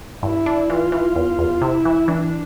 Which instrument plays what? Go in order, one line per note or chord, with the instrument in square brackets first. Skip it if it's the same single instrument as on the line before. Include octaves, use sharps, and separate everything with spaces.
[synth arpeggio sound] G2 [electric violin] E4
[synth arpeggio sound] D4
[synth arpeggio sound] E3 [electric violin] F4
[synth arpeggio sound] E3
E2
E2
[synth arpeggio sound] C3 [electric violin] E4
[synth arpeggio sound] E3
[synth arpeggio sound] E3 [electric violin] D4